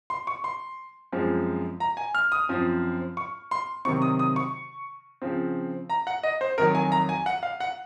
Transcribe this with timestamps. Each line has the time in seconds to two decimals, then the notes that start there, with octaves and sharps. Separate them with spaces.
0.10 C6
0.27 C#6
0.44 C6
1.12 F#2 F3 G#3 C4
1.80 A#5
1.97 G#5
2.15 F6
2.32 D#6
2.49 F#2 F3 C4
3.17 C#6
3.51 C6
3.85 C3 D#3 F#3 C4 C#6
4.02 D#6
4.19 D#6
4.36 C#6
5.22 C#3 F3 C4
5.90 A#5
6.07 F#5
6.23 D#5
6.41 C5
6.58 F2 D#3 F#3 A#4
6.75 G#5
6.92 A#5
7.09 G#5
7.26 F#5
7.43 F5
7.60 F#5